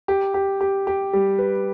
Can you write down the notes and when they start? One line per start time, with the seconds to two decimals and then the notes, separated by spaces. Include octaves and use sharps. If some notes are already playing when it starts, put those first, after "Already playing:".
0.08 G4
0.34 G4
0.61 G4
0.87 G4
1.13 G3
1.39 B4